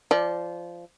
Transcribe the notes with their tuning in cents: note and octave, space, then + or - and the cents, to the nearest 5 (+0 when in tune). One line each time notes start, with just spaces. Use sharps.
F3 -15 D5 +0